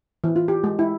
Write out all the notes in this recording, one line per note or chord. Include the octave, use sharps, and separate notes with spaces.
E3
F4
G4
G#3
E4